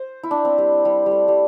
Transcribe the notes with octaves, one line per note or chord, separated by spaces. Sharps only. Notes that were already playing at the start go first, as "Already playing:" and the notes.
Already playing: C5
E4
D4
C4
G3
G3
G3
A3
G3